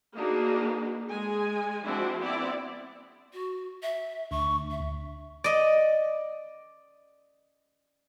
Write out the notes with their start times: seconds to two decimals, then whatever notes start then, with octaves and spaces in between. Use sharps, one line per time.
0.16 A#3 D4 D#4 F#4 G#4 B4
1.09 G#3 G#4 G#5
1.83 F3 G#3 C4 D4 E4 F#4
2.18 B3 C4 E4 D5
3.33 F#4
3.82 E5
4.31 D2 C#6
4.70 E5
5.44 D5 D#5